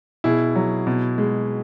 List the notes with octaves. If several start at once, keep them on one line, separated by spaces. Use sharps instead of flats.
B2 E4 G#4
F#3
B2
G#3